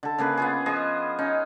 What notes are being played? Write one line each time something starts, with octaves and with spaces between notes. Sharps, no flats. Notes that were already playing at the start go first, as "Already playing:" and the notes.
D3 A4
C#3 A#3 G#4 B4
B3 F4 G#4
F3 G#4 D#5
C#4 D#4